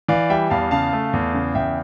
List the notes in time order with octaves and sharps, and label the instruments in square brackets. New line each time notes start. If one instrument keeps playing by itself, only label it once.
[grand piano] E3 D5 F5
G3 E5 G5
E2 F5 A5
C#3 F5 A5
A3
E2
C#3
E2 E5 G5